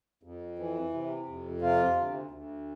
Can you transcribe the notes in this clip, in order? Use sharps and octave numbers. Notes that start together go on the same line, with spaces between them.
F2
E3
C3
F2
C3 F4
D2
D2